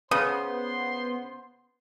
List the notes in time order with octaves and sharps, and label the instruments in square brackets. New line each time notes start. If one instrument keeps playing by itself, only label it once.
[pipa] C#3 [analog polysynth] B3 [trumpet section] C5 C6 [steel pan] D#6